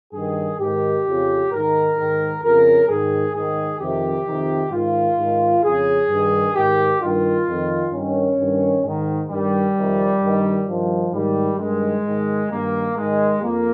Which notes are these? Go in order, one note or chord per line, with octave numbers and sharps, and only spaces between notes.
G2 D#3 G#4
G#2 D#3 G4
F2 C#3
G#2 D#3 A#4
G#2 D#3
F2 C#3 A#4
G#2 D#3 G#4
G#2 D#3 G#4
F2 C3 D#3 G4
F2 C3 D#3
G#2 D#3 F4
G#2 D#3
F2 C#3 G#4
G2 D#3
G#2 D#3 G4
G2 D#3 F4
F2 D#3
G2 D#3 C#4
G2 D#3
G#2 D#3
G2 D#3 G3
F2 C3 D#3
G2 D#3
G2 D#3 F3
G#2 D#3 G3
G2 D#3 G#3
G#2 D#3
G2 D#3 A#3
G#2 D#3 G#3
F2 A#3